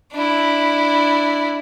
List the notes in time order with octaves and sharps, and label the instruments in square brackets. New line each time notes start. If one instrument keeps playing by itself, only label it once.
[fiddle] D4 E4